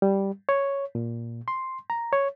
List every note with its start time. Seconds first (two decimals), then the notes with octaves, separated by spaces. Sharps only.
0.02 G3
0.49 C#5
0.95 A#2
1.48 C6
1.90 A#5
2.13 C#5